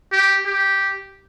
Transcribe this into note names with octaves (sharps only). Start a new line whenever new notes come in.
G4
G4